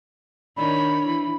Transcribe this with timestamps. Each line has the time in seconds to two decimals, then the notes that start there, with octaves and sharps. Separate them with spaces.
0.56 D#3 D4 C#5 B5
1.06 E3